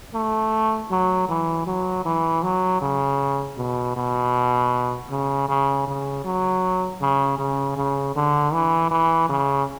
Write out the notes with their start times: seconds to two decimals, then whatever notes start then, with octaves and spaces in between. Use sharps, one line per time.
0.14 A3
0.90 F#3
1.29 E3
1.67 F#3
2.05 E3
2.43 F#3
2.81 C#3
3.57 B2
3.96 B2
5.10 C#3
5.48 C#3
5.87 C#3
6.24 F#3
7.01 C#3
7.38 C#3
7.76 C#3
8.15 D3
8.53 E3
8.91 E3
9.29 C#3